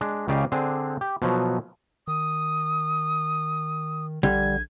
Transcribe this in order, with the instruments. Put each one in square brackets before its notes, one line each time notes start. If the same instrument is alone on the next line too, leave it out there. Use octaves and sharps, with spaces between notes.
[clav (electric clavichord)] G#3 D4
C#2 C#3 G4 D5 D#5 F5
D3 C4 D4 G#4
G4
B2 F3 F#3
[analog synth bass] D#3 [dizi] D#6
[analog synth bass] A#1 [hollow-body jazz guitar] D3 G3 [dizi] G#6